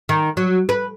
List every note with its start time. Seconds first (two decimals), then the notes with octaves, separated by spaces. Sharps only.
0.09 D#3
0.37 F#3
0.69 B4